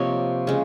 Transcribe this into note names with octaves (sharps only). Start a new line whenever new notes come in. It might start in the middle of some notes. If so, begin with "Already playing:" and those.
Already playing: C3 F3 A#3 C#5 D#5
C#3 G#3